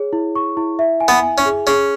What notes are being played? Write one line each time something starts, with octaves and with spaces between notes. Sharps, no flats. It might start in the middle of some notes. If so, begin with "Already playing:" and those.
Already playing: G#4 C#5
E4
C#6
E4
E5
G#5
B3
G#5
C#4
G#4
C#4 G#4